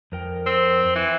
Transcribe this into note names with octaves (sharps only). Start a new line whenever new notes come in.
F2 A#4 G5
C4
E3